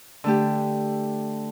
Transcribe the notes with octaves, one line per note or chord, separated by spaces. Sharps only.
D3 A3 G4